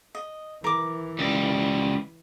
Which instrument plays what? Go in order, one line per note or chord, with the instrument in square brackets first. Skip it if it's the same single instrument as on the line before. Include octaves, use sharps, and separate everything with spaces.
[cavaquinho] D#5
[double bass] E3 [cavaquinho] A#4 D6
[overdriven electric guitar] C#2 G3